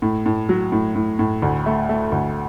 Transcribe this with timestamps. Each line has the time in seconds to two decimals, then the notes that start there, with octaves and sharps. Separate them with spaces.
0.02 A2
0.26 A2
0.49 F#3
0.72 A2
0.95 A2
1.19 A2
1.42 D2
1.66 A3
1.89 A3
2.12 D2